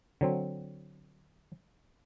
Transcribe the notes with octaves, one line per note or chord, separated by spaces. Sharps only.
D3 F#3 C4